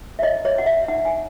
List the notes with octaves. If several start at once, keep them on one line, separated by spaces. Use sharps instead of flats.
E5
C#5 D#5
C#5
C#5 F#5
E5
D#4 F#5
G#5